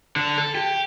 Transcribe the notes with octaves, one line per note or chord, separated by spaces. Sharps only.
D3
A4
G4